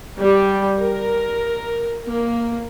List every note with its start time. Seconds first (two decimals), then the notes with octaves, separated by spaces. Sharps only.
0.18 G3
0.77 A#4
2.04 A#3